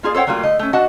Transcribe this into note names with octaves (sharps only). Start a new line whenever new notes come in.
A#3 F4 G#4 D5
A4 C5 C#5 F#5 G5
F#3 G3 A3 A#3 F4
D3 A3 D#5
A3 C#4
D4 F#4 D#5 F#5 A5